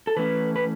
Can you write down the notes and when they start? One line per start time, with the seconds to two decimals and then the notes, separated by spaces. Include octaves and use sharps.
0.07 A4
0.17 E3 A3 C#4 B4
0.56 B4